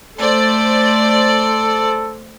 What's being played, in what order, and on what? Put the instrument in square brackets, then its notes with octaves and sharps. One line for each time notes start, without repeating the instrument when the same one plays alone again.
[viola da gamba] A3 [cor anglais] A4 [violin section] C5 D5